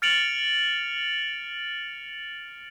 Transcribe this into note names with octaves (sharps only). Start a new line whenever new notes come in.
F6 A6 C#7 D7 F7 F#7